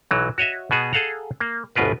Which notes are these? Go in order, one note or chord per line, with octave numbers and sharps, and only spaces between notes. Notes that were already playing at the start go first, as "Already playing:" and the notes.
B1 E3 F#3
F#4 C#5 D#5 E5
B2 B3 F#4 G#4
G#4 A4 F5 F#5 A#5
A#3
G1 D2 B2 F4 A#4 B4